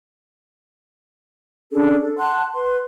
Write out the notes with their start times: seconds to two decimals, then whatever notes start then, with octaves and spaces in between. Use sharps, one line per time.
1.71 C#4 D4 G#4 A4
2.01 A4
2.18 F#5 A5 C6 F#6
2.53 B4 C6